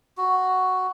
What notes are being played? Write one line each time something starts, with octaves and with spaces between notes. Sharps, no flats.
F#4